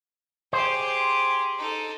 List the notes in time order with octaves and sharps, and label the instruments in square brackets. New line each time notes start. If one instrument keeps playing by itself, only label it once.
[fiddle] G4 G#4 [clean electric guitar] C5
[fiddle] D#4 A4